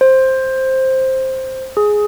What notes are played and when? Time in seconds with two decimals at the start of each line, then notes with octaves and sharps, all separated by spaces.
0.01 C5
1.77 G#4